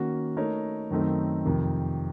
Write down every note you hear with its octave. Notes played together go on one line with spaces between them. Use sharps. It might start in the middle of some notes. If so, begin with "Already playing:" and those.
Already playing: D#3 A#3 C#4 F#4
A3 D#4 A#4 C#5
F#2 D#3 A3 C4 D#4
F2 C3 D#3